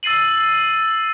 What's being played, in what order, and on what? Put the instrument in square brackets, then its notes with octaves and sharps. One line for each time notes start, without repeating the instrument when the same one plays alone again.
[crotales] E6 A6 C7 D#7 F#7